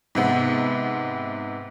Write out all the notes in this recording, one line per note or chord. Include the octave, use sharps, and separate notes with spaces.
G#2 C3 B3